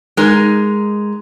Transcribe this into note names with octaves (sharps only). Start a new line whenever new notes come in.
G#3 D#4 A#4